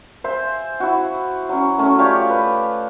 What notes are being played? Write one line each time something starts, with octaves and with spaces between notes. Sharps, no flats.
C5 E5 G#5
E4 F#4
F#3 C#4
A3 C#4
F4 G4 C#5 D5
B4